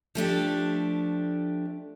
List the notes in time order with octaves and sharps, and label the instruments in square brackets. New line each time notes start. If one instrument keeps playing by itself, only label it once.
[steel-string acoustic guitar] F3 A3 D4 G4